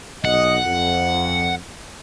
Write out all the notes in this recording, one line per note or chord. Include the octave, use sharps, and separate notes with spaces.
B1 D#5 F#5
F2